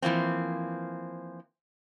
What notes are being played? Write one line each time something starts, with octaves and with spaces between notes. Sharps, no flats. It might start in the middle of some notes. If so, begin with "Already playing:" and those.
E3 F3 A#3 C4